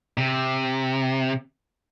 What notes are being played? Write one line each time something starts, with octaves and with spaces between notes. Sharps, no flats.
C3